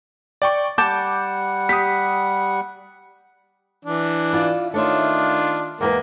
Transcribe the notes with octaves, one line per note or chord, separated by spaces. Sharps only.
D5 G5 C#6
G3 F#5 A5 D6 G6 A6
G4 D#6 B6
E3 D4
E4 F4 D5
D#3 A3 D4 F4 C#5 E5
E2 G#3 A#3 B4